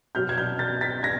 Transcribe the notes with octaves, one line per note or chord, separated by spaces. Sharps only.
B2 F#3 F6 G6
G#6
F6 G6
G6 A6
A6 B6
G#6 A#6